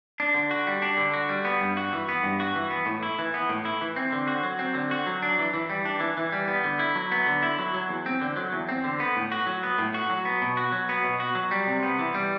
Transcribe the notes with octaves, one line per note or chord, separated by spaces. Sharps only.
D4
D3
F#4
G3
D4
D3
F#4
G3
B3
G2
F#4
E3
B3
G2
F#4
E3
B3
A2
E4
E3
B3
A2
E4
E3
C4
D3
F#4
F#3
C4
D3
F#4
F#3
D4
E3
E3
G3
D4
E3
E3
G3
B3
D3
E4
F#3
B3
D3
E4
F#3
F#3
E2
C4
D3
F#3
E2
C4
D3
B3
A2
F#4
F#3
B3
A2
F#4
F#3
B3
B2
F#4
F#3
B3
B2
F#4
F#3
G3
C3
B3
E3
G3